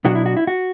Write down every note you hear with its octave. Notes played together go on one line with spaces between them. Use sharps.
B2 F#3 B3 D4 F#4
E4
F#4
E4
F#4